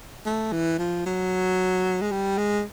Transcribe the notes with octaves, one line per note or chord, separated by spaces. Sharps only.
A3
E3
F3
F#3
G#3
G3
G#3